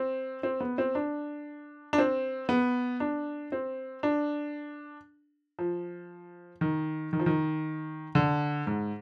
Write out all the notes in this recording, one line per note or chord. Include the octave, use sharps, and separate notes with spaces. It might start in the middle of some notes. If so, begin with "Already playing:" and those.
Already playing: C4
C4
B3
C4
D4
D4
C4
B3
D4
C4
D4
F3
D#3
D#3
F3
D#3
D3
G#2